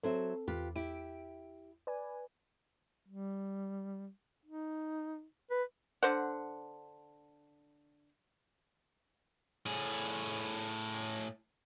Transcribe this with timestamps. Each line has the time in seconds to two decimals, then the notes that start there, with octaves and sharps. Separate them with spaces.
0.03 F#3 C4 A4 C5 E5
0.48 E2 F4 G4 B4
0.76 E4 G4 D7
1.87 B4 D5 G#5
3.08 G3
4.46 D#4
5.51 B4
6.03 D3 C5 F#5
9.66 A2 G#4